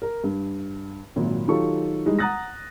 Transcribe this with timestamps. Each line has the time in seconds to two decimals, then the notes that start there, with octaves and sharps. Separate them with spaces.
0.02 A#4
0.24 G2
1.16 G#1 A#2 F#3
1.48 D#3 F#3 F4 G4 A4 C#6
2.05 E3 G3 G#3 D#4
2.19 F#5 A#5 D#6 F#6 A6 A#6